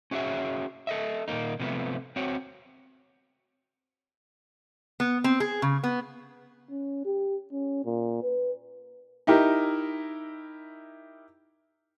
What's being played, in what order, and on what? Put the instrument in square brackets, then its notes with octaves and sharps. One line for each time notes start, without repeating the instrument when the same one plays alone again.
[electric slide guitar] C#4 F#4 G#4 C#5 E5
A4 D#5 E5
A#2 D#3 E3 A#3 D#4
C3 F3 G#3 A3 B3
C4 F#4 C#5
[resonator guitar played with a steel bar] B3
C4
G#4
C#3
B3
[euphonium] C#4
G4
C#4
A#2
B4
[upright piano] D#4 E4 G4 A#4